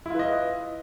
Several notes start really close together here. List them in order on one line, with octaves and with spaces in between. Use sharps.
E4 F4 B4 D#5